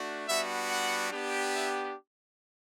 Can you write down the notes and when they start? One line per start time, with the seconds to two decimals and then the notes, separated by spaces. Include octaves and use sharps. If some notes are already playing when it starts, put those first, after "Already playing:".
Already playing: A3 D4 F#4
0.28 G3 B3 D4 F#4 E5
0.70 F#5
1.12 B3 D4 G4
1.54 E5